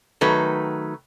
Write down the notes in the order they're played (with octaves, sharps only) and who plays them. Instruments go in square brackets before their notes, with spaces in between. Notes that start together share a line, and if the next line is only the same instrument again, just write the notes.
[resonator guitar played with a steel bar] D#3 F#3 A3 B4